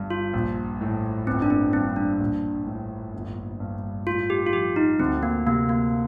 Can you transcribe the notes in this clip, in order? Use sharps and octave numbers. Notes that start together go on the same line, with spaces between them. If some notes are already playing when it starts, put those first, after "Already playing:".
Already playing: G1 G2
F4
A#1
A2
G1 C4
D4
C4
G2 C4
D4
A#1
A2
G1
G2
A2 F4
G4
F4
F3 G4
D#4
D2 C4
A#3
C3 A#3
A#3